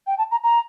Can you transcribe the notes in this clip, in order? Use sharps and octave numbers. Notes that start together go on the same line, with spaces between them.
G5
A5
A#5
A#5